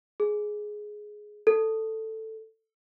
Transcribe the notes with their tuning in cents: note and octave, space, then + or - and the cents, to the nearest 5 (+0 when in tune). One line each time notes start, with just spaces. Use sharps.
G#4 +10
A4 +10